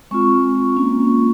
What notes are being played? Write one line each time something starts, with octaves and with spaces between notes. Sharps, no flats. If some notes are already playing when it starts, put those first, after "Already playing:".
G#3 C4 F4 C#6
A#3 C#4 F4